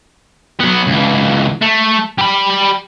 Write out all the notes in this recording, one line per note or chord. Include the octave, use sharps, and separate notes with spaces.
F#3 B3
C#2 E3
A3
G3 B5